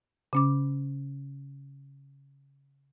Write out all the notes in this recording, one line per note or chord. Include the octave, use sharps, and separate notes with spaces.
C#3 C#4 D6